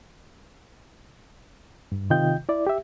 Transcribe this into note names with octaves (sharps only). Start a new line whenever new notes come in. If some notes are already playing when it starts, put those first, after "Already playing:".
G2
C3 D#3 F4 D#5 G5 G6
E4 D5
G4 E5